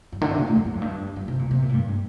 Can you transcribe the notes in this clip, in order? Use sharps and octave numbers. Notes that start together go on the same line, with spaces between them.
G2
D3
C3
A#2
A2
F2
G2
F2
G2
G2
C3
A#2
C3
A#2
A2
G2